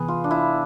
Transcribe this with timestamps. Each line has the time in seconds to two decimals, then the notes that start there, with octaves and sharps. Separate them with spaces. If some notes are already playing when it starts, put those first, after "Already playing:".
Already playing: C3 E3 B3 G#4 B4
0.08 F4
0.24 D4
0.31 E4